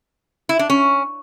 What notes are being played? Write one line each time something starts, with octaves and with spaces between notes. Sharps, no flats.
E4
D4
C#4